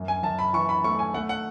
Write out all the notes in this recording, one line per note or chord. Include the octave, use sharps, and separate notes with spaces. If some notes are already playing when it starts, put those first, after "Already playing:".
Already playing: F#2
G#5
F#2 A5
B5
E3 C#6
B5
A3 C#6
G#5
A3 F#5
F#5